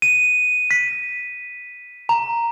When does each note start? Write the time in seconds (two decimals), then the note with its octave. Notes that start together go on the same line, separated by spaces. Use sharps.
0.02 D#7
0.71 B6
2.09 A#5